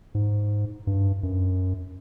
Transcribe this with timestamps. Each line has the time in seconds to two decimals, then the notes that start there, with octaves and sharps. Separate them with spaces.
0.15 G#2
0.87 G2
1.23 F#2